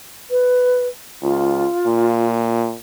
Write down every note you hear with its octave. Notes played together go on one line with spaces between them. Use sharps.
B4
C#2 F4
A#2